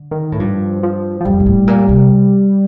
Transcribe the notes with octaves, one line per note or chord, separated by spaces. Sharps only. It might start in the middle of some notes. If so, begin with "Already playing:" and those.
Already playing: D3
D#3
A2
G2 F3
F3
F3
F2 G3
A#2
A2
A#2
C3